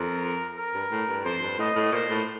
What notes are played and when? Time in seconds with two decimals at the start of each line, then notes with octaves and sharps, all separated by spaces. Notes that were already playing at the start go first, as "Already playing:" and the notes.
Already playing: F2 A#4
0.57 A#4
0.74 G2
0.91 A2
1.09 G2
1.25 F2 C5
1.42 G2
1.58 A2 D#5
1.76 A2
1.92 A#2 C5
2.10 A2